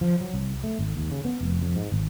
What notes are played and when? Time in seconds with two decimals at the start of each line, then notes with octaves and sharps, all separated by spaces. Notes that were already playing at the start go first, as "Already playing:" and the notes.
0.01 F3
0.21 F#3
0.34 C2
0.64 A3
0.79 G#1
0.96 D#2
1.11 C#3
1.25 B3
1.41 F1
1.62 F2
1.76 G#2
1.92 G#1